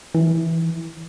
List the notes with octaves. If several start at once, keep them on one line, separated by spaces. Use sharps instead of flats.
E3